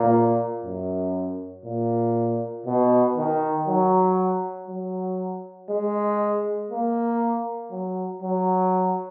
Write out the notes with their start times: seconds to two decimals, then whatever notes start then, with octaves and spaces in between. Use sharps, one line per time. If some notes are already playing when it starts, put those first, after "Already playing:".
Already playing: A#2
0.65 F#2
1.65 A#2
2.66 B2
3.17 D#3
3.67 F#3
4.68 F#3
5.70 G#3
6.71 A#3
7.71 F#3
8.22 F#3